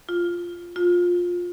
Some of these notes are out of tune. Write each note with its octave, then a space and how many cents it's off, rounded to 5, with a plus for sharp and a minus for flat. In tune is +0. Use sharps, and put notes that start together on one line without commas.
F4 -5
F4 +15